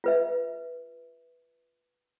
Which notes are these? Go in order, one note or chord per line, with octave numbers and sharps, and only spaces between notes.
F4 B4 E5